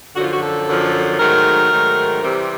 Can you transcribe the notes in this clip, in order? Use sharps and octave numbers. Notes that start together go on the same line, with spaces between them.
F#2 D3 F3 F#4
F4
F#4
A4
F#2 D3 F3
G#2 D#3 F#3 A3 A#4
G#2 D#3 F#3 A3
C3 E3 G3 C4